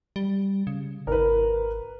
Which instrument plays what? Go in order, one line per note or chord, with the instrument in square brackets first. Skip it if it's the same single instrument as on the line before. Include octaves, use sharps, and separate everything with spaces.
[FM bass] G3
C#3
[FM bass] G#1 [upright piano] A#4 B4